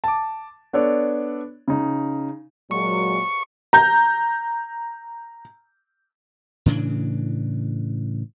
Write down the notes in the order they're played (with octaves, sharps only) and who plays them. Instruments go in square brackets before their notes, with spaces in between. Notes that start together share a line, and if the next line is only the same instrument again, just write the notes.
[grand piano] A5 D6
B3 D4 A4 C#5 D5
C#3 D#4
[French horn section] A#2 F#3 G#3 [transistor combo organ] C#6
[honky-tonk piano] A#5 G6
[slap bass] A2 C#3 E3 D4